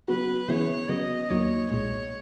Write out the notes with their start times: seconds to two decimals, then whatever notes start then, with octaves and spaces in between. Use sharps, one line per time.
0.08 C#3 F#3 B3 F#4 B4
0.49 C#3 E3 B3 E4 G#4 C#5
0.89 C#3 F#3 B3 D#5
1.30 D#2 D#3 F#3 A#3 C#5
1.70 B1 A#2 G#3 C#5